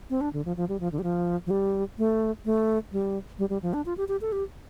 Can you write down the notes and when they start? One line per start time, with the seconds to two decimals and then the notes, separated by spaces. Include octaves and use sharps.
0.10 C4
0.21 D4
0.33 D3
0.45 F3
0.57 F3
0.69 G3
0.80 F3
0.92 D3
0.99 G3
1.03 F3
1.46 F3
1.50 G3
1.98 A3
2.45 A3
2.92 G3
3.39 G3
3.50 G3
3.63 F3
3.73 D4
3.86 F4
3.97 G4
4.08 G4
4.21 A4
4.32 G4